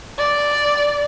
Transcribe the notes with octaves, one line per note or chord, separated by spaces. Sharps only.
D5